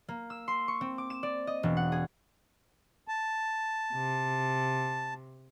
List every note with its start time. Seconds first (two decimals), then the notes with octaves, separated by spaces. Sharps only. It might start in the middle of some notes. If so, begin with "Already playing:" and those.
0.08 A#3
0.30 E6
0.48 C6
0.68 C#6
0.81 C4
0.98 D6
1.10 E7
1.23 D5
1.47 D#5
1.63 E1
1.77 F#5
1.92 G#4
3.08 A5
3.94 C3